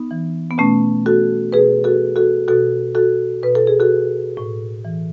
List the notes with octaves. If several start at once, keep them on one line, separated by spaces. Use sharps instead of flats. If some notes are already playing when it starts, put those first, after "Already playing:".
Already playing: B3 D#4
E3
B3
B2 A3 C#4
F#4 A4
B2 G#4 B4
F#4 A4
F#4 A4
B2 F#4 A4
F#4 A4
B2 B4
A4
G#4
F#4 A4
A2
E3